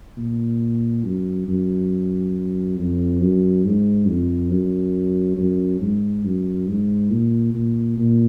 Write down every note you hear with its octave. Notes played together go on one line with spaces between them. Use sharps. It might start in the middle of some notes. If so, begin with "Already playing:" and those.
A#2
F#2
F#2
F2
F#2
G#2
F2
F#2
F#2
G#2
F#2
G#2
A#2
A#2
A#2